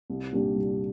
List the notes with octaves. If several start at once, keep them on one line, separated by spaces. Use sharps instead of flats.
C2
A#2 G3 D4 G4
C2